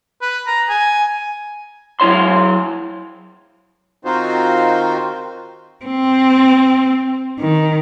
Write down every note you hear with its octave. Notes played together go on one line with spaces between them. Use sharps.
B4
A#5
G#5
F#3 E4 C#5 C6
D#3 C4 D#4 F4 F#4 C5
C4
D#3